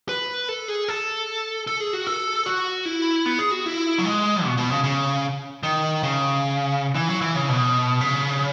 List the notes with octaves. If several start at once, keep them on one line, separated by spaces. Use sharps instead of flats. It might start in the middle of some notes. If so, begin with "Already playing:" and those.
B4
A4
G#4
A4
A4
G#4
F#4
A4
F#4
E4
B3
G#4
F#4
E4
F#3
G#3
B2
B2
C#3
C#3
D#3
C#3
E3
F#3
E3
C#3
B2
C#3